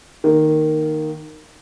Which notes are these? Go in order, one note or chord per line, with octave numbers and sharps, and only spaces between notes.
D#3 A#3